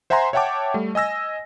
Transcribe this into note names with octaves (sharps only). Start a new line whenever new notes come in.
C5 E5 F#5 G#5 A#5 C6
C#5 E5 F#5 G5 A5 D6
G3 A3
D#5 G#5 E6 A#6